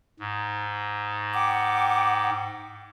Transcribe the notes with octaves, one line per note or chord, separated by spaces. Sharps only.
G#2
F#5 G5 D6